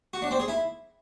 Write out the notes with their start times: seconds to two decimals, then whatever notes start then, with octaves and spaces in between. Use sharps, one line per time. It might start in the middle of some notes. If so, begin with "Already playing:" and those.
0.13 F#4
0.22 D4
0.31 C4
0.39 G#4
0.48 E4